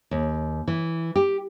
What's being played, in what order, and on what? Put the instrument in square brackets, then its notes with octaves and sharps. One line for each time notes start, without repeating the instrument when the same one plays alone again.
[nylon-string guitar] D#2
E3
G4